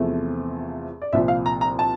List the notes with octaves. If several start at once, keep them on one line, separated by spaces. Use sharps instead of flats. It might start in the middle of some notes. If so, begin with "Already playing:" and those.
Already playing: E2 C3 F3 A3
D5
C2 A#2 F3 E5
F5
A#5
A#5
A5